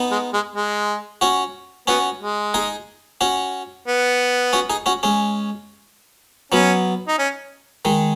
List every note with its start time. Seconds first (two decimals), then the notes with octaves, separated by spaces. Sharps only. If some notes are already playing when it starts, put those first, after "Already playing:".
Already playing: B3 D#4
0.11 G#3
0.33 G#3
0.56 G#3
1.21 C#4 F#4
1.87 B3 C#4 F#4
2.21 G#3
2.54 D#4 G#4
3.21 C#4 F#4
3.87 B3
4.53 C#4 F#4
4.70 D#4 G#4
4.86 C#4 F#4
5.03 G#3 C#4
6.52 F#3 B3 C#4
7.08 D#4
7.18 C#4
7.85 D#3 G#3